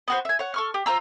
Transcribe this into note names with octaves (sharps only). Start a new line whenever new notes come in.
B3 F#4 C5
E5 G#5
C#5 F#5
A4 C#6 F6
G4
F4 C5 A#5 E6